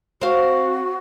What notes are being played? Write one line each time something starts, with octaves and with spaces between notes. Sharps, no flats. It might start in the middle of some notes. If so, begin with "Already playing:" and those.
C4 F#4 F5